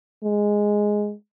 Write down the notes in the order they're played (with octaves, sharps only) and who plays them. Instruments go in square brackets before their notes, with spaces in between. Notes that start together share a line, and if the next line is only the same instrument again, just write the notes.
[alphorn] G#3